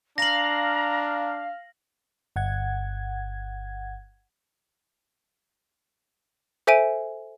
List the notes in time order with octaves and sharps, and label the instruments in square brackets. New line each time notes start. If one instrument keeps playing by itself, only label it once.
[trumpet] D4 [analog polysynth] F5 [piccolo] A#5 [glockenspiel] A#6 F#7
[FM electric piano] G1 F#5 G#6
[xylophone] A4 C5 E5 G#5 D7 D#7